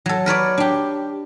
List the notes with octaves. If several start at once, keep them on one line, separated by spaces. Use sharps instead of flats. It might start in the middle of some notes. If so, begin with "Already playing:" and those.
F#3 A4
A#4 B4 C#5 D5
D4 G4